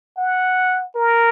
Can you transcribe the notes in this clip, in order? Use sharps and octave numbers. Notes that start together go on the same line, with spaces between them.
F#5
A#4